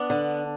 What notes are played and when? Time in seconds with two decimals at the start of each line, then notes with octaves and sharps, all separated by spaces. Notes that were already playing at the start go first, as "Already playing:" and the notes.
Already playing: B3 D4
0.10 D3